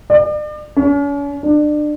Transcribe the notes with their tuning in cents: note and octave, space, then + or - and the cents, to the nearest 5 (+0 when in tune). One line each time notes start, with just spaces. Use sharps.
D5 +40
C#4 +40
D4 +30